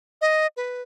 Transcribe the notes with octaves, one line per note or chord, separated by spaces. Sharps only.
D#5
B4